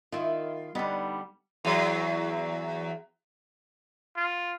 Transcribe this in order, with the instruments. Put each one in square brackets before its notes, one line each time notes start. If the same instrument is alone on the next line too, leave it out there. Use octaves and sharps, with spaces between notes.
[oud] D#3 E4 [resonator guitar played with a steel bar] F4
[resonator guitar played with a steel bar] D3 B3 [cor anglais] G3 [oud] D#4
[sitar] E2 F#3
[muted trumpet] F4